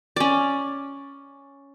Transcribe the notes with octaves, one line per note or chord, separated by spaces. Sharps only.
C#4 D5